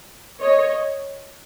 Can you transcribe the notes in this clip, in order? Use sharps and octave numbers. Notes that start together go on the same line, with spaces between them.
C#5 D#5